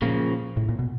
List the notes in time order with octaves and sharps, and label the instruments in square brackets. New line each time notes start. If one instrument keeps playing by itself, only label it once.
[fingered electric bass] A#2 [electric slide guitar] C#3 F3 A#3
[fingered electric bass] A2
A#2
B2